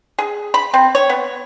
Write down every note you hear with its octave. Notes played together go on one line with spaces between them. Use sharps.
G#4
B5
C4
C#5
B3